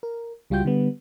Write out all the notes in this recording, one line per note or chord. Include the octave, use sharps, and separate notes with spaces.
A#4
C#2 G3 F4 F#4 G5 G6
D3 G3 B3